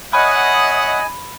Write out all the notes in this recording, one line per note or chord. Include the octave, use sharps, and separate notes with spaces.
C#5 D#5 E5 F#5 G#5 B5 D#6